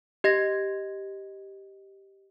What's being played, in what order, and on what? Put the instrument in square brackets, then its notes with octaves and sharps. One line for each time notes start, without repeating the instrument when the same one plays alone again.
[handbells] G4 D#5 G#6 A#6